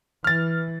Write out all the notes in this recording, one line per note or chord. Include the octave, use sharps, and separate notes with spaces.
E3 F6 A6